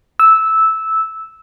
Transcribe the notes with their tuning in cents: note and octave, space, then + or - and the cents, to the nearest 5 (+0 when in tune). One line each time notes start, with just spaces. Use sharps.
E6 -10